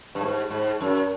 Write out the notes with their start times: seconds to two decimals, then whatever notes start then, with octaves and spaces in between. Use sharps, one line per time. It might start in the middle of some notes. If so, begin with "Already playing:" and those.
0.15 G2
0.21 G#2
0.50 G#2
0.81 F#2